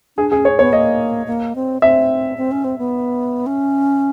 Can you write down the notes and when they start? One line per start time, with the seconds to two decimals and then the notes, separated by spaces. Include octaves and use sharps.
0.17 D4 G#4
0.31 C#4 G#4
0.45 C#5
0.59 B3 C#5
0.72 A#3 D#5
1.27 A#3
1.56 C4
1.82 C4 E5
2.37 C4
2.51 C#4
2.65 C4
2.78 B3
3.46 C#4